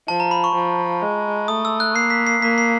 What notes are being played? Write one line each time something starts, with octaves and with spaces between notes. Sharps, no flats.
F3 A5
A#5
B5
C#6
F3
G#3
A3 D#6
E6
F#6
A#3 C7
B6
C7
A#3 B6
C7